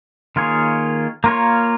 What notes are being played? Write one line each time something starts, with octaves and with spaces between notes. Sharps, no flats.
D#3 A#3 F4 G#4 C#5
A#3 F4 A#4 C#5